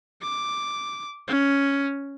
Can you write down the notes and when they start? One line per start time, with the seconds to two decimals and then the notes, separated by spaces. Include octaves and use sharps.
0.22 D6
1.28 C#4